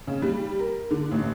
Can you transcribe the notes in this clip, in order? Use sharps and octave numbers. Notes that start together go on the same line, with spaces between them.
C#3
G3
A#4
D3
A1